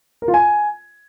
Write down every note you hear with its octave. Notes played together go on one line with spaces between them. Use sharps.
A#4
F4
G#5